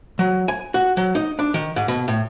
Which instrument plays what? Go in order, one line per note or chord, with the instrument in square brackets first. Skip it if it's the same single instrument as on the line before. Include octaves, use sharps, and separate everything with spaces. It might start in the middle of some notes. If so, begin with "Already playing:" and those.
[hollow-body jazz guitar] F#3
G#5
F#4
F#3
D#4
D4
D#3
G#2
B2
A2